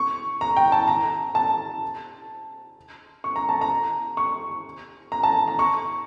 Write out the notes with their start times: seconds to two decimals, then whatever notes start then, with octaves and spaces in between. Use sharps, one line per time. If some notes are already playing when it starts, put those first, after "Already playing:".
Already playing: C#6
0.41 A#5
0.57 G5
0.72 A5
0.88 A#5
1.35 A5
3.24 C#6
3.36 A#5
3.49 A5
3.61 A#5
4.17 C#6
5.12 A#5
5.23 A5
5.48 A#5
5.59 C#6